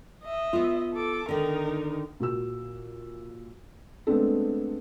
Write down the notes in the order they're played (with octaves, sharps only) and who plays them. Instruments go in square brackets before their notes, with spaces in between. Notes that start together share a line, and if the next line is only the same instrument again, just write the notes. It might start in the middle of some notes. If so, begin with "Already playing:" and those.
[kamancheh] D#5 E5
[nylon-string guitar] B3 F4
[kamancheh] A4 D6
[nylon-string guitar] D3 D#3 [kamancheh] D#4 A#4
[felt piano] A#2 F#4 E6
G#3 A3 B3 C4 D4 A4